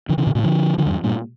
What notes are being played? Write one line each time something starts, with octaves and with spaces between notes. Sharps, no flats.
D3 F3
C#3 E3
A#2 D3
A2 C#3
D3 F3
D3 F3
E2 G2
G2 A#2